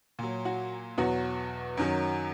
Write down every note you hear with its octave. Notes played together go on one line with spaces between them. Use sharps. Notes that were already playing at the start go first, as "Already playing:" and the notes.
A#2 F#3
F#4
E2 B2 F#3 F#4
F#2 D#3 F#3